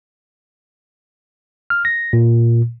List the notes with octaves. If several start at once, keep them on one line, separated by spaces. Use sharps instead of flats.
F6
A#6
A#2